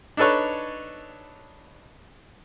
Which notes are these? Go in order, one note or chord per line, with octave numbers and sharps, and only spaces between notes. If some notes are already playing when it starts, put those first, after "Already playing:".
D4 D#4 A4 B4 C#5